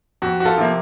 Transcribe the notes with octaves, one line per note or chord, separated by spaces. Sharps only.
F2 F#4
F#4
F4 A4
C3 F3 A#3